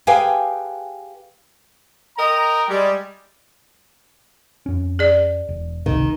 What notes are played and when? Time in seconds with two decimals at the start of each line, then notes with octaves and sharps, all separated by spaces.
0.07 G4 G#4 B4 F5 G5 G#5
2.17 A#4 D#5 G5 A#5
2.67 G3 G#3
4.66 F2 C#4
4.99 G#4 D5
5.49 E1
5.86 G#1 C#2 C3 D#3